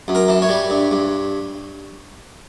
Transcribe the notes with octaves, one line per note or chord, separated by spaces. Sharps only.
F#2
A#4
E3
C#5
G3
G2
G2